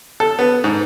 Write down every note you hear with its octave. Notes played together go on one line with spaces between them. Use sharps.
A4
B3
G#2